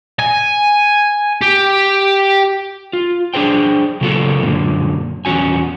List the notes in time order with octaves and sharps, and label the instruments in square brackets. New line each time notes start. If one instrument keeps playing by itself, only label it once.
[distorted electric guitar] G#5
G4
[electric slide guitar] F4
D4 G#4 C5 G5
C#3 F#3 A#3 B3 F4 A4
F#2 A#2 D3
E2 A#2 C#4 F#4 G#5